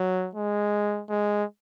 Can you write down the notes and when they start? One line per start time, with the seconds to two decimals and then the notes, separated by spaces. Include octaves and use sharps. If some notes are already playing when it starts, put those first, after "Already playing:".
Already playing: F#3
0.35 G#3
1.10 G#3